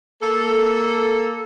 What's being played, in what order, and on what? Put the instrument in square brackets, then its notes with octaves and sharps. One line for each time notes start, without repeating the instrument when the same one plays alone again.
[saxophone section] A#3 A4